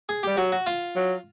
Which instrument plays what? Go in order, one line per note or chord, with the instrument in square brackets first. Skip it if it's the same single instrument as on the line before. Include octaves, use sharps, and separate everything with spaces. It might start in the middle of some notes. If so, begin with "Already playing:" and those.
[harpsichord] G#4
[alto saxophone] G3 [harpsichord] G4
[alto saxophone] F#3 [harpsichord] F#4
[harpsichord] F#4
F4
[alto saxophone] F#3